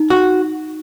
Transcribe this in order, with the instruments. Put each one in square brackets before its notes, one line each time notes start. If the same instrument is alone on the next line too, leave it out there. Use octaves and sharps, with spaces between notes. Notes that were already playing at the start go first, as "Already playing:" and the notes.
Already playing: [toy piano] D#4
[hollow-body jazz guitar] F#4